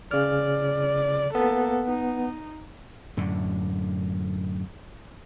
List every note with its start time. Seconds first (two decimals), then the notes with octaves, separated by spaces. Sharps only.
0.11 C#3 D5 F6
1.35 A#3 B3 A4
1.87 D#4
3.17 F#2 A2 D3